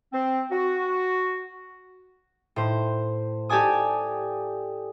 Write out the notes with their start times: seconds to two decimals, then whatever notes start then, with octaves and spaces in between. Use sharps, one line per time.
0.13 C4
0.52 F#4
2.56 A2 C5
3.49 G4 A4 D5 G#5 D#6